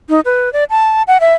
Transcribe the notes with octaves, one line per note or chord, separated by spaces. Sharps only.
D#4
B4
D5
A5
F#5
E5